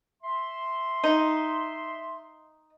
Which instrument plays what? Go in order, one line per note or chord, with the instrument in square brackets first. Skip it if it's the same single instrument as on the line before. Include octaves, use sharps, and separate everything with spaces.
[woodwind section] E5 C6
[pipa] D#4